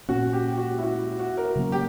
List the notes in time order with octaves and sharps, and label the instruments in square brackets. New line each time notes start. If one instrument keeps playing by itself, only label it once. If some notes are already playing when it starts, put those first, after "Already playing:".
[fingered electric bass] A#2 A#3 C#4 [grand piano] F#4
[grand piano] G4
G4
F#4
E4
F#4
F#4
A#4
[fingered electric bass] C#3 F#3 A#3 C#4
[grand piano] G4